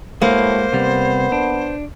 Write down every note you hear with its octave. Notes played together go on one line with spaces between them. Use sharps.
A2 G#3 A#3 F#4 B4 C5
C3 G3 B3
D4